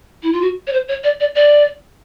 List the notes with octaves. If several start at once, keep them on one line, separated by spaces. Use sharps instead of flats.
E4
F4
F#4
C#5
C5
C#5
D5
D5
D5